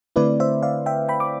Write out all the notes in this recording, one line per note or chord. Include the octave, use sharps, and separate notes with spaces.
D3 A3 C4 E4 B4 D5
C5 E5
D5 F5
E5 G5
G5 B5
D6